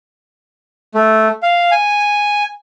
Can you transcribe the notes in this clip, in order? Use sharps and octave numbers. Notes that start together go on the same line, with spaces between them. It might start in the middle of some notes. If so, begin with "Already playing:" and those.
A3
F5
G#5